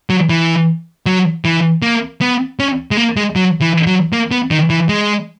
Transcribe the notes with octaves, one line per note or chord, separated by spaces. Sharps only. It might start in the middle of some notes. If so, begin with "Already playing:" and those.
F#3
E3
F#3
E3
A#3
B3
C#4
G#3
A#3
G#3
F#3
E3
F#3
A#3
B3
D#3
E3
G#3